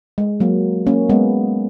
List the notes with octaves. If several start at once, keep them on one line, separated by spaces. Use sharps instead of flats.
G#3
F#3 A#3
A#3 C#4
G#3 B3